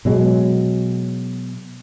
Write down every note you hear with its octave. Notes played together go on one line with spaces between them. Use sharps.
B2 F#3 G#3